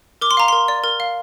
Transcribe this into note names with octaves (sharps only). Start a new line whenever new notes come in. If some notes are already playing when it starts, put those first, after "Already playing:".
A#4 D6
C6
F5 A#5
A#4 C6
D5
A#4
F5